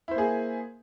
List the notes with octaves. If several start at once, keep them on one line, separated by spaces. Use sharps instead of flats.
A#3 E4 G#4 C5